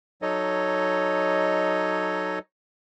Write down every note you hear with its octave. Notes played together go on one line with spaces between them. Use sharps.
F#3 D#4 A4 C#5 D#5